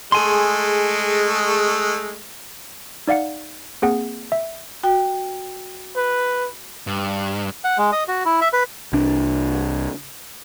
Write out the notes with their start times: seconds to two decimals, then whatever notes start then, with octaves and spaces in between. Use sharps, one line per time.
0.12 G#3 A3 G#4 G#5 C6
3.08 D#4 D5 F5 F#5 C#7
3.82 A#3 C4 G#4 F#5
4.32 E5
4.83 F#4 G5
5.96 B4
6.87 G2
7.64 F#5
7.78 G#3
7.92 D#5
8.08 F#4
8.25 E4
8.41 E5
8.53 B4
8.93 C2 D4